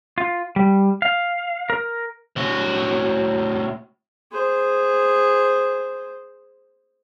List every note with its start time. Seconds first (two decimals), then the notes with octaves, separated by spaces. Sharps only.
0.18 F4
0.56 G3
1.02 F5
1.70 A#4
2.36 A2 F#4
4.32 G#4 C5